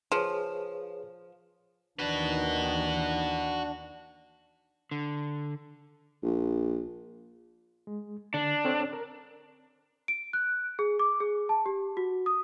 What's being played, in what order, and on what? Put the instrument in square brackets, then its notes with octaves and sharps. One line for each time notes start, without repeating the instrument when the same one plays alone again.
[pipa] F3 [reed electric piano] G#4 B4 C#5
[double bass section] D#2 D#3 E3 [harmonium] D4 [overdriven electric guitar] F#4 B4
[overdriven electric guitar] D3
[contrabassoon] A#1
[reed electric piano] G#3
[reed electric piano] D3 [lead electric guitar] D4
[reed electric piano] C4 A4 C#5
A#4
[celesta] D7
F#6
G#4
D6
G#4
A5
G4
F#4
D#6